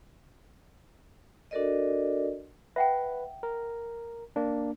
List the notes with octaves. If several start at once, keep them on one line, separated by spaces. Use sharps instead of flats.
D4 F#4 A4 A#4 D5 D#5
B4 E5 F#5 G5
A#4
A#3 D4